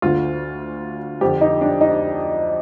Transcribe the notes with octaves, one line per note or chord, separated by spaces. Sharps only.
D2 D3 F4
F2 D3 G4
D#4
D4
D#4